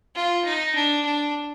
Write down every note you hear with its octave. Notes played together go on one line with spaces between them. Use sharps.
F4
D#4
D4
D4